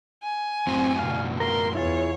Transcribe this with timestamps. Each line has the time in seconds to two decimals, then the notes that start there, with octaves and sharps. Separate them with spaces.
0.23 G#5
0.67 F#2 A2 F#3 C4
0.99 B2 D3 F5
1.40 A#4 F5 C6
1.75 E2 B2 E4 F4 G#4 C#5